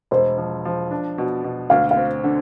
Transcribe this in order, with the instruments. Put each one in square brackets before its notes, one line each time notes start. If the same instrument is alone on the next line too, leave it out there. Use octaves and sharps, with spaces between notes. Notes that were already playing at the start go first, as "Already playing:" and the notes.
[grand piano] E1 [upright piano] C5
[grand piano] F3
F3
D4
B2
B2
[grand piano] D2 [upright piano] F5
[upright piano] F5
[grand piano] C4
D3